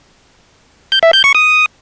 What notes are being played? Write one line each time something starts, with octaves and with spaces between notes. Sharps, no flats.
G6
E5
G6
C#6
D#6